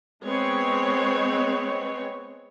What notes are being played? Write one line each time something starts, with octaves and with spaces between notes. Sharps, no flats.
G#3 B3 C4 C#5